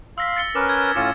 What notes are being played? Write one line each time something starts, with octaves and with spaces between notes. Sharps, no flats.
F5 C6 E6 A#6 B6
A6 C#7 G7
C#4 A#4 B4 D6
G#6
A2 C#4 F4 D6 C#7 E7